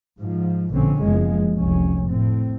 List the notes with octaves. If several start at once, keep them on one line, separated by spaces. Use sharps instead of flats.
G#2 F3
A#1 B2 D3 C4 C#4
F#1 E2 F3 G#3
F1 C2 C#4
A2 C4